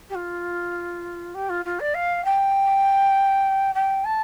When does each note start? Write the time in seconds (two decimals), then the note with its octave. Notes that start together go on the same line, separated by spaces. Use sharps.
0.10 G4
0.15 F4
1.34 G4
1.49 F4
1.65 F4
1.80 D5
1.94 F5
2.24 G5
3.75 G5
4.04 A5